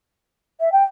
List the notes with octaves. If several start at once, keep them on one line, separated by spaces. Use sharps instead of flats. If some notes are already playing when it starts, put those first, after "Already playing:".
E5
G5